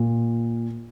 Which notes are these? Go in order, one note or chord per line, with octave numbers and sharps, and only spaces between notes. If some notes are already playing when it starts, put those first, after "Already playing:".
Already playing: A#2